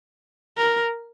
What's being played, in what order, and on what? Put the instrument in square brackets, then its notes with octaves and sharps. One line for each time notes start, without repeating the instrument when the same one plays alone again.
[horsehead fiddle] A#4